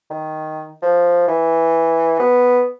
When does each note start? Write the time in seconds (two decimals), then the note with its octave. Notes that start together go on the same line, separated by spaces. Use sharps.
0.10 D#3
0.82 F3
1.28 E3
2.20 B3